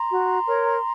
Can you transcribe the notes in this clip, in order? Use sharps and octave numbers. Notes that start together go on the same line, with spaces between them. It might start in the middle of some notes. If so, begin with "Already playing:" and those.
Already playing: A#5 C6
F#4
A#4 C#5